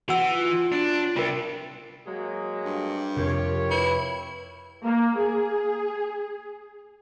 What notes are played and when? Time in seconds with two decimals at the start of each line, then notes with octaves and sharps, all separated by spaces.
0.09 E3 F#4 F#5 E6
0.29 F4
0.72 D4
1.16 C3 G3 F4 A#4
2.06 F#3 G#3 A#3
2.65 G2
3.17 F2 C3 F4 G4 A#4 C#5
3.71 E4 B4
4.84 A#3
5.18 G#4